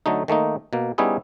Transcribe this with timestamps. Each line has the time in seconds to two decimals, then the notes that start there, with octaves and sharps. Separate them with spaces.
0.06 D3 F#3 A3 D#4
0.28 D#3 A3 A#3 D#4
0.73 B2 A#3
0.98 G3 B3 C#4 D#4 E4 G#4